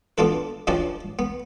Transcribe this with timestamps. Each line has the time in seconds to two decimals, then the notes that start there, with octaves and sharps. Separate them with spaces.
0.18 B3 D4 F4 A4 B4
0.67 F3 C#4 D4 G4 B4 D5
1.19 B3